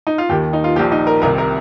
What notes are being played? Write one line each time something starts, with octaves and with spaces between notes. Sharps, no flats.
D#4
F4
D#2 D#3 G4
D#4
F4
A#1 A#2 F3 G4
D#4
A#4
C2 C3 D#3 A#4
A#4